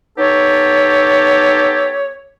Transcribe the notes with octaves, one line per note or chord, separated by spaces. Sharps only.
B3 D#4 G4 A4 C#5